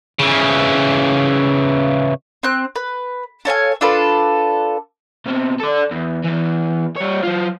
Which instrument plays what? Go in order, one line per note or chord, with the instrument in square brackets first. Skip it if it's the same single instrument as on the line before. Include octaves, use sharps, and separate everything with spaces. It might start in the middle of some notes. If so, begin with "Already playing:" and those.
[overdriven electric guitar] C#3 E3
[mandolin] C4 F#6
B4
A4 C#5 F5 G#5
D4 F4 A4 B4
[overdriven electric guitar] B2 C4
A4 D5
E2
E2 E3
G3 C#5
F#3 F4